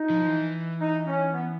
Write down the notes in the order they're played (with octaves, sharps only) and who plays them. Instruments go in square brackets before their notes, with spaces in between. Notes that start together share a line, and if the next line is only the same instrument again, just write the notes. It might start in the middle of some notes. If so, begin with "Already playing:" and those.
Already playing: [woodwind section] D#4
[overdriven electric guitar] F3
E3
[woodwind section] D#4
C#4
B3